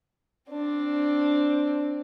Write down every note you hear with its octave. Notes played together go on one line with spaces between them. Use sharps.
C4 D4